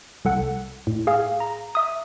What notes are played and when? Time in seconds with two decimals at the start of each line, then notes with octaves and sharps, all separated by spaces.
0.25 C2 A4 F#5
0.87 A2
1.07 G#4 F5
1.40 A#5
1.75 E5 D#6